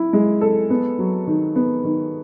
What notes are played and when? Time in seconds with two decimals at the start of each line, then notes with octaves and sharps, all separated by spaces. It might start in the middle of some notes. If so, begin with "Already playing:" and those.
Already playing: E4
0.13 G#3
0.41 A4
0.70 B3
0.99 F#3
1.27 D#3
1.56 B3
1.84 D#3